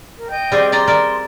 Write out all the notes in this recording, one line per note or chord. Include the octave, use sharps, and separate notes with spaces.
A#4
D#5 G5 G6
G3 C4 G#4
D5 D#5 A#5 C6
A#4 D5 E5